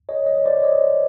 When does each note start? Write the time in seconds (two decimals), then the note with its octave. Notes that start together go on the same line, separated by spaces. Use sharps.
0.09 C#5 D#5
0.26 C#5 D#5
0.46 C5 D5
0.63 C#5 D#5